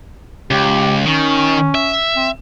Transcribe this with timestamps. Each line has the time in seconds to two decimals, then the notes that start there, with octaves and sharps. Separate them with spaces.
0.51 C#2 G4
1.06 D#3 C#4
1.75 E5
2.16 C4